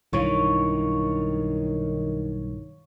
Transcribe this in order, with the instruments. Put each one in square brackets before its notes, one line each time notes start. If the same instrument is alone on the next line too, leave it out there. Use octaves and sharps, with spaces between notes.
[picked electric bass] B1 G2 E3 [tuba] D#3 [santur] C#5 F5